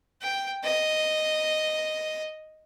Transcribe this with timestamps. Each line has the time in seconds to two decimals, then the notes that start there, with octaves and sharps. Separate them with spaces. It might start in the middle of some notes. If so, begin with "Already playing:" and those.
0.22 G5
0.64 D#5